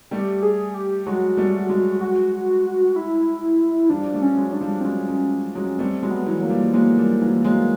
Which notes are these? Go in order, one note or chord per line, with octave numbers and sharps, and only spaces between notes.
G3 A3 G4
G#4
G4
F#3 G#3 F#4
G3 A3
F#3 G#3
F#4
E4
F3 G3 D4
G3 A3
C#4
F#3 G#3
D4
F3 G3
C4
F#3 G#3 C#4
F#3 G#3
F#3 G#3
G3 A3 C4
F#3 G#3
B3
E3 F#3
F#3 A#3
F3 G3
F#3 G#3 A#3
F3 G3
E3 F#3
F#3 G#3